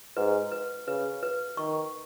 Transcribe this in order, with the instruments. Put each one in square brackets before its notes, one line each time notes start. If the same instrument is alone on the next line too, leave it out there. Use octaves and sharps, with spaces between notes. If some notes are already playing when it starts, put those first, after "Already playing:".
[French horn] G#2 [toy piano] B4
[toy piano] B4
[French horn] C#3 [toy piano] B4
[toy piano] B4
[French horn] D#3 [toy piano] C#6